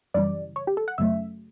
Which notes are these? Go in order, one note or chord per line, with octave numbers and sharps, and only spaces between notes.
F#2 C#3 E3 G3 D5
C#5
G4
A4
F#5
F#2 C#3 F#3 A3 E5